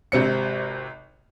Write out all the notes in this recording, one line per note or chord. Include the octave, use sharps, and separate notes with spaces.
G#1 C3 C4 C#7